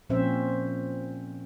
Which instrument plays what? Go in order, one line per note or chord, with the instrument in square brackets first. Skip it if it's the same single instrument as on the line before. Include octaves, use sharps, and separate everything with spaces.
[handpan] A#2 F3 C4 C#4 C5 E5